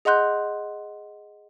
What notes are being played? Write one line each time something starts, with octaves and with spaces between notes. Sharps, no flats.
G#4 D#5 F#5 C6 F#6 G6